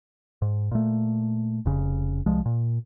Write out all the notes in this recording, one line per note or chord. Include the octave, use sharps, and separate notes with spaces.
G#2
A#2 A3
F1 C#3
C2 F3 G#3
A#2